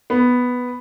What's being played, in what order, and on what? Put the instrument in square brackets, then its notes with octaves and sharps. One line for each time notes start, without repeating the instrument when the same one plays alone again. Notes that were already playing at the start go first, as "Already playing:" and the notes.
[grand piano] B3